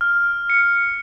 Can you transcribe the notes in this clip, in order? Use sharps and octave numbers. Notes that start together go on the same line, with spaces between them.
F6
C#7